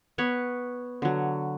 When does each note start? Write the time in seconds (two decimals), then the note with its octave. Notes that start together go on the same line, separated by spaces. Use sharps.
0.18 B3 B4 C#5
1.02 D3 F#3